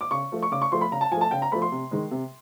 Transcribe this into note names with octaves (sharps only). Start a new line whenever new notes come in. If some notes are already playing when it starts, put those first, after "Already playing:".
D6
C#3 C#6
F3 A3
C#6
C#3 D6
C#6
F3 A3 C6
B5
C#3 A#5
A5
F3 A3 G#5
A5
C#3 G5
A#5
F3 A3 B5
C6
C3
D#3 G#3
C3